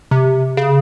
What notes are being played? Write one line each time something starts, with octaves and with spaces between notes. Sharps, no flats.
C3
C#3